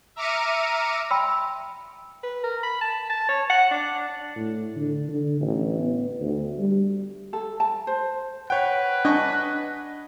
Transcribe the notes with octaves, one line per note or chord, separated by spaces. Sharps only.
E5 A#5 D6 F6 C#7 D#7
G5 B5 C6 E6
B4
A#4
B5
A5
A5
C#5
F#5
D4
A2
D3
D3
A1
B3
D2
G3
A4
A5
C5
B4 C#5 F#5 G5 F#6
D4 D#5 G#5 C#6